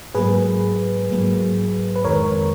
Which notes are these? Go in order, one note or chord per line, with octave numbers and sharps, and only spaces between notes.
G#2 F#3 A#3 G#4 B4
G#2 F#3 A#3
B4
F2 D#3 G#3 A#4 C#5